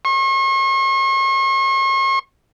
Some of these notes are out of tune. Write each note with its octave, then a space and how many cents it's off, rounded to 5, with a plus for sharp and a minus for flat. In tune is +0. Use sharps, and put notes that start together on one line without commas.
C#6 -45